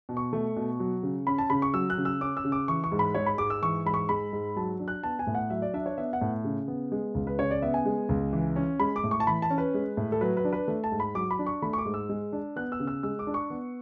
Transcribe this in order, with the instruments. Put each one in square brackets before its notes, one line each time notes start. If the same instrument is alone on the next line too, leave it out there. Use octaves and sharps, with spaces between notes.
[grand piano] B2
C#6
A3
B2
F#3
C#3
C#4 B5
A5
C#3 B5
C#6
F#3 E6
F#6
C#3
E6
C#4 D6
E6
C#3
D6
E3 C#6
C#6
G#2
B5
G#3 C#5
B5
G#2 D6
E6
E3 C#6
G#2 B5
C#6
G#3 B5
G#2
F#3 A5
D4
F#6
B3 A5
G#5
A2
F#5
F#3 E5
D5
D4 E5
C#5
B3 E5
F#5
A2
C#3
B3
G#3
C#2
B4
C#3 C#5
D5
B3 E5
G#5
G#3
C#2
E3
C#4
G#3 B5
D6
A2
C#6
A5
E3 B5
A5
C#4
B4
G#3
A2
A4
F#3 B4
B4
D4
B4
A3
A5
G#2
B5
F#3 D6
B5
D4
C#6
A3 B5
C#6
D6
G#2
E6
G#3
D4
B3 F#6
E6
C#3
E6
G#3 E6
D6
D4
C#6
B3